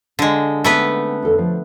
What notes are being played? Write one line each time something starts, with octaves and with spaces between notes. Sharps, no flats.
D3 G#3 F5
G#3 A3 B3 C4 D#4 B4
E2 A4 F5
F3 D4